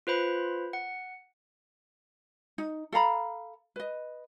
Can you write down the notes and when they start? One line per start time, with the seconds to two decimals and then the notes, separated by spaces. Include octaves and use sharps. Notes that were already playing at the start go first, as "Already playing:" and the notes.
0.07 F4 B4 C5 B5
0.73 F#5
2.58 D#4
2.92 A4 F5 A#5 B5
3.76 B4 D#5